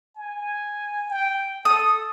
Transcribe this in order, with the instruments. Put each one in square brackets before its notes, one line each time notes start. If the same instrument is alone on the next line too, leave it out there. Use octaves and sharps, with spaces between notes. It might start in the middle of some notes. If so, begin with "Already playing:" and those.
[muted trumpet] G#5
G5
[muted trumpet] A4 [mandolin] D#6